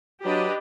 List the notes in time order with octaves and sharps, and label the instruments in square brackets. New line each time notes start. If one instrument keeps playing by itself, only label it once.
[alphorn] F#3 [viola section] D4 G4 B4 D#5